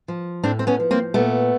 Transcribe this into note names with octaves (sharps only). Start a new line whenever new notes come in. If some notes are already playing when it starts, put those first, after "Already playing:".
F3
A2 C4 D4
C4
B3 C#4
F3
A#3 C4
A#2 A3 B3